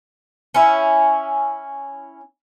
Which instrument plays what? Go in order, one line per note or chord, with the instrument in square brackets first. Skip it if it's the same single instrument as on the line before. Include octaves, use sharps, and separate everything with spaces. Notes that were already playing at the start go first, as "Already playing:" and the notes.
[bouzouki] C#4 E4